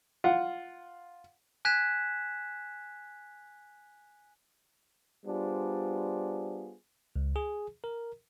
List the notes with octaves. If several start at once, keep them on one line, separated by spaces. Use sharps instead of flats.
F4 F#5
G#5 F#6 G#6 B6 E7
G3 B3 D4 F4 G#4 C5
C#2
G#4
A#4